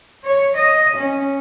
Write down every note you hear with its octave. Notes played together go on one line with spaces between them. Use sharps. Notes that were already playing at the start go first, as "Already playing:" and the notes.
C#5
D#5
C#4